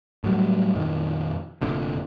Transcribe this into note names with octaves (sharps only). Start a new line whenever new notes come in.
A2 F#3 G3
F2 A#2 D#3
F1 A#2 D3